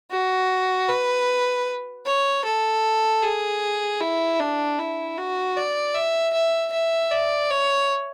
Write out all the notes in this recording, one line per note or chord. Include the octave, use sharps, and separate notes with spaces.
F#4
B4
C#5
A4
G#4
E4
D4
E4
F#4
D5
E5
E5
E5
D5
C#5